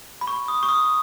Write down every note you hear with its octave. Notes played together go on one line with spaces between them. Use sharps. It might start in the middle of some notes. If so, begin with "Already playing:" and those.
B5
C#6
D#6
C#6
D#6